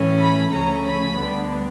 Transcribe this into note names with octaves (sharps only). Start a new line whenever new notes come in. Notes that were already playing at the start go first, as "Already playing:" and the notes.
Already playing: A2 E3 A3 C#4
B5
D2 C#3 F3 A3 C#4 A#5
B5
D2 D3 G3 B3 D4